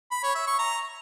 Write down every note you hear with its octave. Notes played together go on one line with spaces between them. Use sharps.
B5
C#5
E5
C#6
A#5